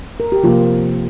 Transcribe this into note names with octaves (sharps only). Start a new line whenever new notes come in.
A#4
G4
C3 F3 A#3 F4